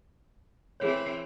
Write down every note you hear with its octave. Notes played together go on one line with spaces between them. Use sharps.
E3 C4 G#4 C#5